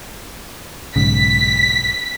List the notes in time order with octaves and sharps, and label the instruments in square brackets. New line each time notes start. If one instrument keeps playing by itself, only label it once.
[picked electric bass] B1 G#2 C#3 [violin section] B6